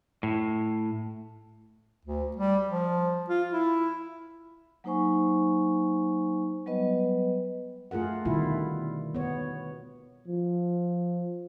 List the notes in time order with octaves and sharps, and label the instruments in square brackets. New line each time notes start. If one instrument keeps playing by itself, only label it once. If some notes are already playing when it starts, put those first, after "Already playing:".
[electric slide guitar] A2
[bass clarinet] D2
G3
F3
F4
E4
[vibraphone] F#3 A#3 D#4 C5 G#5 C#6
F#3 G3 B3 B4 D#5
[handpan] A3 F4 G#4 A#4 F#5
B2 D3 D#3 G3 E4 F4
B3 C#5
[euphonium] F3